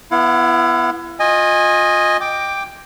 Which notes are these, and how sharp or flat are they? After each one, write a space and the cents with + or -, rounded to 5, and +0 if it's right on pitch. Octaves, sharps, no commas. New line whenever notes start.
B3 +0 E4 +30 F#5 -45
F4 +35 D#5 +0 G#5 -20
G5 +10 D6 +0